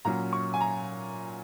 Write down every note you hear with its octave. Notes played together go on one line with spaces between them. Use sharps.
A#2 F#3 C#4 A#5
C#6
G#5
A#5